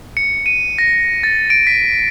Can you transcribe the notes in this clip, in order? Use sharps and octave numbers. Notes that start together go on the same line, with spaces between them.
C#7
D#7
A#6
A6
D7
B6